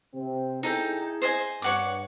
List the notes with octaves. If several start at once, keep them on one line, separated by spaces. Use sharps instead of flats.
C3 C4
D#4 E4 G#4 A4 G5
C5 D#5 G#5
G2 C#5 F#5 D6